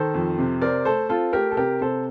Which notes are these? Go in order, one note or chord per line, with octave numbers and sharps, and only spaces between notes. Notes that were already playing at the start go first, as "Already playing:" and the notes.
Already playing: D#3 A4 C5
F2
C3
C4 A#4 D5
A3 A4 C5
C4 F4 A4
A3 G4 A#4
A4
C3 G4 A#4
C3 A4 C5